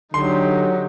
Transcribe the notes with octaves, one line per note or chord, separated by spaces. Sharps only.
D3 F#3 D#4 G4 C6